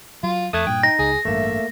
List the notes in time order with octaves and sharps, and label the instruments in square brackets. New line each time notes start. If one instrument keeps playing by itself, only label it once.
[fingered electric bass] F#3 [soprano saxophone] F4
[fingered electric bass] F2 [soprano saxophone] A3 [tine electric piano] D#6 F#6 G#6
[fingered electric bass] G2 A#2 [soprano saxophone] G5
[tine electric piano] D#4 [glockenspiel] A#6
[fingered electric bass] C#2 [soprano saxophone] G#4
[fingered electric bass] A1 G2 [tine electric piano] A3 A#3 [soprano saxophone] E5